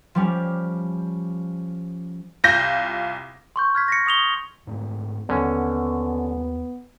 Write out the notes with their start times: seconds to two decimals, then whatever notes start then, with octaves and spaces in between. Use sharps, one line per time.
0.15 F3 G3 C#4 D5
2.44 C2 F4 G6 A#6
3.56 C6 C#6 G6
3.75 F6 G#6 B6
3.88 A#6 B6 C#7
4.06 C#6 D#6 F7 G7
4.67 G#2 A3 C4
5.29 D#2 D3 B3 C#4